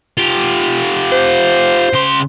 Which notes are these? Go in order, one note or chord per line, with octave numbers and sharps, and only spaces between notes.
F4 G4
C5
C#3 C6